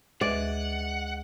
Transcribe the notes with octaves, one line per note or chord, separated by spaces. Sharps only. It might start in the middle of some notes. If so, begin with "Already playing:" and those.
D2 G#3 B4 D5 E5 F#5